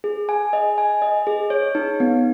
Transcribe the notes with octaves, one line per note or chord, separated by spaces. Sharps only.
G#4
G#5
D#5
G#5
D#5
G#4
C#5
D#4
B3